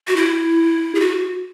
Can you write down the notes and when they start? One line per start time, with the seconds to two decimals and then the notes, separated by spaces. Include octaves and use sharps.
0.08 F#4
0.16 E4
0.95 G#4
1.00 F#4